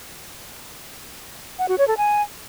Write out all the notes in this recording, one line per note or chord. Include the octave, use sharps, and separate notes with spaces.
F#5
F#4
C#5
A4
G#5